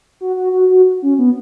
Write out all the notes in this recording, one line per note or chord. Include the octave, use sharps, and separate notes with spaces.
F#4
F#4
F#4
F#4
C#4
B3